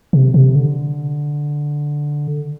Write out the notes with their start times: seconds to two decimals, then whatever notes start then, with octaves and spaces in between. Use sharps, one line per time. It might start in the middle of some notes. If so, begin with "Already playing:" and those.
0.13 C3
0.34 C3
0.55 D3